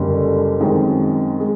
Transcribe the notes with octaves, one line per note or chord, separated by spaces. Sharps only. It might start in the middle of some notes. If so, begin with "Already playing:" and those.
Already playing: F#1 F#2 D3 G3
F#2 D#3 G#3 C4
G#3